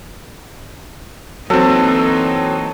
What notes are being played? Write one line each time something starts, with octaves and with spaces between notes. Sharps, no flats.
E3 F#3 A#3 C4 D#4 A4